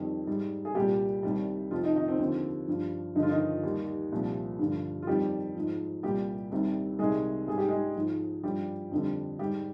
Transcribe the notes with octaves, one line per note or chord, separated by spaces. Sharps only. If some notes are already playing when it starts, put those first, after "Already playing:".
Already playing: F2 D#3 G3
G#2 G3
G#4
C2 A#2 G3 G4
C2 C3 D#3 G3
F2 C3 F3 F4
D#3 D#4
D#3 D#4
C4
D#2 D3 F3 C4
G2 F3
G2 D3 F3 D#4
F4
D#3 D#4
D#2 D#3 G3
C2 A#2 F3
G2 D3 F3
F4
F2 D#3 G3 G4
G#2 F3
C2 A#2 G3 G4
C2 C3 D#3 G3
C2 C3 D#3 G#3 G#4
G#2 G3 G#4
G4
G#3 G#4
G#2 F3
G2 F3 G3 G4
F2 D3 G3
G#2 G3 G4